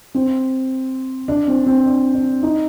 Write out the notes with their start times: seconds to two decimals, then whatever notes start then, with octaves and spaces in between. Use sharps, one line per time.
0.15 C4
1.28 D4
1.48 C4
1.66 C4
1.86 D4
2.14 D4
2.43 D#4